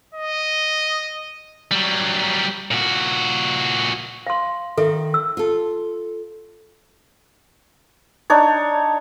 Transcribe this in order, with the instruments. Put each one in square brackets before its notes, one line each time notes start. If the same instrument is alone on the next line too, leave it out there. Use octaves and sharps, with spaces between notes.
[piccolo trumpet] D#5
[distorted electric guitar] F#3 G3
A#2 F#4
[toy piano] F5 C6
[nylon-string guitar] D#3 [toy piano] A4 E5
[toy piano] E6
[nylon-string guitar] F4 A4
[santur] D4 D#4 C#5